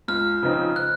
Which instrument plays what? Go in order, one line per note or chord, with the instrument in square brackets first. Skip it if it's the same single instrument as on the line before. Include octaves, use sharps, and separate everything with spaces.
[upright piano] C#2 [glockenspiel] F6
[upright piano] C#3 F3 C4 D#4
[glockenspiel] F#6